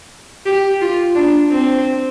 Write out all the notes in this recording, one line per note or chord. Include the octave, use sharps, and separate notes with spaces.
G4
F4
D4
C4